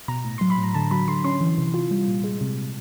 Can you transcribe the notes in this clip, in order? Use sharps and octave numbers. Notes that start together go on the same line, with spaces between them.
B2 A#5
A2
F#3 C6
B5
A2 A#5
D3 A5
F#3 B5
D3 C6
C#4 C6
E3
C3
F4
G3
A#2
G#3
C3